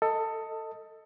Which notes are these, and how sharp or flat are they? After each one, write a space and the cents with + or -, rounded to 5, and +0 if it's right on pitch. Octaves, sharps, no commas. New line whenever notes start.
A4 +20 D#5 +10